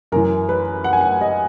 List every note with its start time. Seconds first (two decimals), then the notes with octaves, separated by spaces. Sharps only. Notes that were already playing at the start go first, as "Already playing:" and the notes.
0.12 F#2 E3 A#4
0.49 B4
0.84 F#5
0.93 G#5
1.01 F#5
1.21 D#5